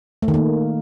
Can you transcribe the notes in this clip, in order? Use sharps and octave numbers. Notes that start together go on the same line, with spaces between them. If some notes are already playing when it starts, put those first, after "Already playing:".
A3
D#3
A#3